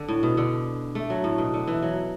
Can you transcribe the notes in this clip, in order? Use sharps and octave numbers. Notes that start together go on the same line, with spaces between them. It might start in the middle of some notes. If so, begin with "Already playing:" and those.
Already playing: D3
A2
B2
D3
A3
F#3
A2
B2
D3
E3
F#3